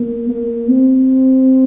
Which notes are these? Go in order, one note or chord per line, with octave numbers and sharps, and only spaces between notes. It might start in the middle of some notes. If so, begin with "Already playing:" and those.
Already playing: A#3
A#3
C4